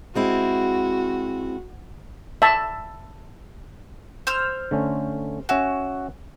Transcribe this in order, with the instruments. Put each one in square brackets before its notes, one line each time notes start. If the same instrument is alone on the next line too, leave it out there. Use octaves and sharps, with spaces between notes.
[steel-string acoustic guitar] G#3 C4 E4 [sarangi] F#4
[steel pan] E5 A5
[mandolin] C5 E6 F6
[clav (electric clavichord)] D3 A3 C#4
[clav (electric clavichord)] C#4 E5 G#5 [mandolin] F#4